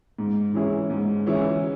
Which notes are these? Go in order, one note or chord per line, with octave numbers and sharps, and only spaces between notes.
G#2
E3 C#4 E4 G#4
G#2
E3 C#4 E4 G#4